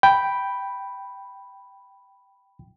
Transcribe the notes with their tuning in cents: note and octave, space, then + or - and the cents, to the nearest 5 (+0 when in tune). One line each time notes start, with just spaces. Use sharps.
G5 +0 B5 +0